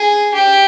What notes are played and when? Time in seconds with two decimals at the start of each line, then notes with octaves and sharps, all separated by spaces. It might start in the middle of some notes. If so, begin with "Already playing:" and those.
Already playing: G#4
0.34 G4